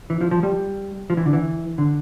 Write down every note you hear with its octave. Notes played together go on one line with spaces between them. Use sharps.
E3
F3
F3
G3
F3
E3
D3
E3
D3